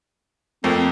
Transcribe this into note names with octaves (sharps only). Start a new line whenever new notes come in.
F2 A3 A#3 C4